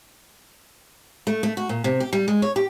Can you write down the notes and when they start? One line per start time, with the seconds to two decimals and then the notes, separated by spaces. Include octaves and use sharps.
1.27 A3
1.43 A3
1.57 F#4
1.69 A#2
1.84 C3
2.00 G4
2.13 G3
2.28 G#3
2.42 C#5
2.56 G4